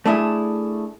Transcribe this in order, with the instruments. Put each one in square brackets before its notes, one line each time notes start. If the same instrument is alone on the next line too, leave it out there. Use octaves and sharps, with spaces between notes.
[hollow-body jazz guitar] A3 D4 E4 G#4